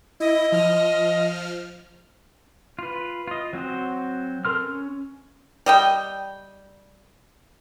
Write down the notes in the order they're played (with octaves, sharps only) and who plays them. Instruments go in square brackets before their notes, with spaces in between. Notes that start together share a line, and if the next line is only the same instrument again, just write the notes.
[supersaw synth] E4 [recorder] D#5
[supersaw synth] F3 F6
[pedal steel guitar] F4 B4
F4 D#5
F#3 C4 F#4 C5
A4 A#4 C6 F6
C#4
[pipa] G3 D#5 G5